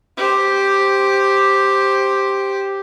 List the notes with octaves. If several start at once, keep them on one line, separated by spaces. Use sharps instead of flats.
G4 C5